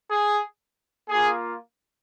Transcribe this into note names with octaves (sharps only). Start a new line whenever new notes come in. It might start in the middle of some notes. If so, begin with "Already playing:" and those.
G#4
A#3 F4 G#4